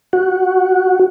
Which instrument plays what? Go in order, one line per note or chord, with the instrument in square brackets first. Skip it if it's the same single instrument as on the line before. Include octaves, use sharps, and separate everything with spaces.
[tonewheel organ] F#4